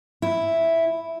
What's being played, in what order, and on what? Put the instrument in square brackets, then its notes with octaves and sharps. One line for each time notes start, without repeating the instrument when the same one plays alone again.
[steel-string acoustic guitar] E4